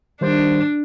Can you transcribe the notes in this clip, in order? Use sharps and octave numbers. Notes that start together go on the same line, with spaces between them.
D#3 G3 D4 C5